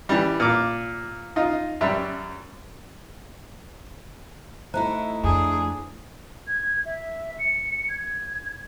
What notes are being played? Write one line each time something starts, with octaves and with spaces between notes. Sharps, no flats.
E3 G3
A#2 D6
D#4 F4
F#2 G3 E5
A3 D#4 E4 C5 A#5 F#6
F2 D4 G#4
G#6
E5
C#7
G#6